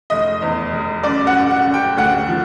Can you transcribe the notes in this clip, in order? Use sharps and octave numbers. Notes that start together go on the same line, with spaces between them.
F1 D#5
E2
F1
F#2 D5
F#5
F#2
F#5
F#2
G5
D2 F#5
F3